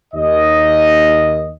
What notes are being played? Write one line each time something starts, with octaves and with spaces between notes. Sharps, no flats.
D#2 D#5